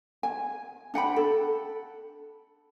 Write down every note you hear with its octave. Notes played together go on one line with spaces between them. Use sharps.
G#5
D4 F#5 G5 B5
A4